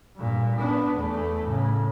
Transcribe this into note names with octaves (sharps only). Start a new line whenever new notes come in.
G2 A#2
B3 D4
E2 A3
A2 C#3